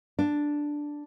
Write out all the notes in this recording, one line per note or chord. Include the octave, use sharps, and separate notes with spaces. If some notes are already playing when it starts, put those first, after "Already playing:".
D4